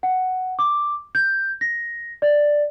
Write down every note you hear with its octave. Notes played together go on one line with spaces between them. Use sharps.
F#5
D6
G6
A#6
D5